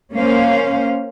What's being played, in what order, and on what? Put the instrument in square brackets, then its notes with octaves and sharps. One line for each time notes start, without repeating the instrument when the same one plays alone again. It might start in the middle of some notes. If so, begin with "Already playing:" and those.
[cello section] A#3 C#4 C5 F5